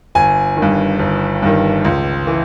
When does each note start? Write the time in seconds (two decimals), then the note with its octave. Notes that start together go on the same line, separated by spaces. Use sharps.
0.15 G1 G#5
0.57 D#3
0.62 G2
0.99 G1
1.42 G2 D#3
1.85 C#2
2.27 E3